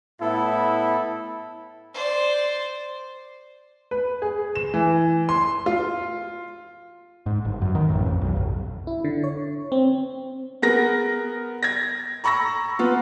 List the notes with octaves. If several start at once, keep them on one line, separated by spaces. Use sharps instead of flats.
A2 B3 E4 A4
C5 D5
B4
G#4
E7
E3
C6
F4
G#2
G1
F#2
D#3
A1
F2
B1
G1
E4
D3
C#5
C4
B3 G#4 A#4 A#6
G#6 A#6
A#5 B5 C#6 E6 A#6
B3 F4